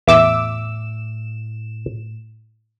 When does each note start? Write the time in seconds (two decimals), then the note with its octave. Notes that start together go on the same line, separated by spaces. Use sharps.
0.07 E2 A2 E5 D6 E6 E7